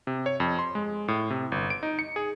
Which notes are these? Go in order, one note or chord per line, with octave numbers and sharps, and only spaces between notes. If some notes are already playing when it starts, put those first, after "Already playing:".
C3
C#5
F2
C6
G#3
A2
C3
G1
D7
D#4
C#7
G#4